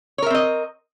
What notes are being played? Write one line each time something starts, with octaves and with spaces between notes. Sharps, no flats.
C4 A#4 C#5 D#5 E5